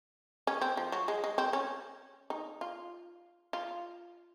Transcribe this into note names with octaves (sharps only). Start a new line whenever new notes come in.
C#4
C4
F3
F#3
G#3
G#3
C4
C#4
D#4
F4
F4